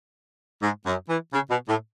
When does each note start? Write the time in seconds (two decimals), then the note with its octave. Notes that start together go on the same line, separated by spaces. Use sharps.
0.63 G#2
0.86 F#2
1.09 E3
1.33 C#3
1.50 B2
1.69 A2